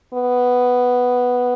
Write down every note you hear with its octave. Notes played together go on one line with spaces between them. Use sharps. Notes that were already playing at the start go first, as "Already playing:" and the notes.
B3